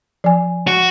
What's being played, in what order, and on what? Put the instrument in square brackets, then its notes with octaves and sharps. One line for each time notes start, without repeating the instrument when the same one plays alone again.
[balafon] F3 G#5
[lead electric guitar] F#4